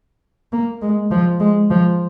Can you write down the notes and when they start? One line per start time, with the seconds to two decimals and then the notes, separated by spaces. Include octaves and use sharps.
0.52 A#3
0.82 G#3
1.11 F3
1.40 G#3
1.70 F3